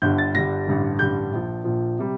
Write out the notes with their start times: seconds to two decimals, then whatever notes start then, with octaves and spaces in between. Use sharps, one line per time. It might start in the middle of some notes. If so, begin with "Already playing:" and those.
0.02 G1 G2 D3 G3 G6
0.18 A6
0.35 G1 G2 D3 G3 A#6
0.67 A1 G2 D3 G3
0.99 A1 G2 D3 G3 G6
1.32 A#1 A#2 F3
1.64 A#1 A#2 F3
1.99 C3 G3